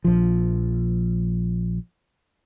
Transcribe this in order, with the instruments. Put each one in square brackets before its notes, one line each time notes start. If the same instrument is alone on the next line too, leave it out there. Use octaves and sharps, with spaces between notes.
[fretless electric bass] A#1 F3